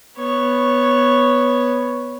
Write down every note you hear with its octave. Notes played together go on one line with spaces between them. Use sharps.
B3 C#5